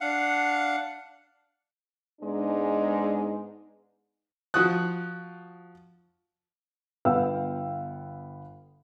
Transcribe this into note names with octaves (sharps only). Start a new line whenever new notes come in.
D4 F5 F#5
G#2 G#3 B3 D4 D#4
F3 F4 F#4 D#6 F#6
G1 B3 F5 G5 E6